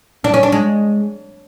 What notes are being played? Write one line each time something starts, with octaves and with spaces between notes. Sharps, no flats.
D4
C#4
D4
G#3